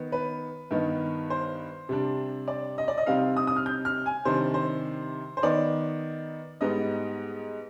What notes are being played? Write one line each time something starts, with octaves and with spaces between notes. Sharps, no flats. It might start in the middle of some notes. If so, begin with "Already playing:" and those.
Already playing: D#3 B3
B4
G2 D#3 B3 D#4
C5
C3 G3 D4
D5
D#5
D5
D#5
C3 G3 C4 D#4 F5
D#6
D#6
F6
G6
F6
G#5
C3 D#3 G3 D4 C5
C5
C5
D#3 B3 D#4 D5
G#2 G3 B3 D#4 D#5